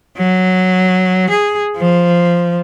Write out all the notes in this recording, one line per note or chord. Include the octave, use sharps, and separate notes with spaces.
F#3
G#4
F3